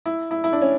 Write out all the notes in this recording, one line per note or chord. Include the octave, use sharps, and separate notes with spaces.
E4
E4
E4
D4
C#4